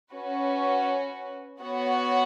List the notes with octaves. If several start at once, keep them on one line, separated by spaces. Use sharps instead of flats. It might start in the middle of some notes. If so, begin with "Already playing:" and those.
C#4 F#4 B4
B3 F#4 C#5 F#5